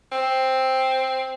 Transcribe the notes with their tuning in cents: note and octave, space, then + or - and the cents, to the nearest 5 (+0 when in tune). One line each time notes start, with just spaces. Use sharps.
C4 +5